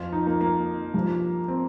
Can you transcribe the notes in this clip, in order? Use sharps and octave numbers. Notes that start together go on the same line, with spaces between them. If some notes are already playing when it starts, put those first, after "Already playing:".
Already playing: F2 F3 F4
D#4
A#3
A#3
G2 F3
C4